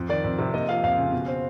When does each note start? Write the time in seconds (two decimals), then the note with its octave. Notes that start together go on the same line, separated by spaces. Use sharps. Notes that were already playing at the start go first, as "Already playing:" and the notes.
Already playing: F2
0.09 D#3 D5
0.24 F2
0.39 C3
0.53 A#3 D#5
0.69 F3 F5
0.83 F2 F5
0.98 C#3
1.12 B2
1.28 C4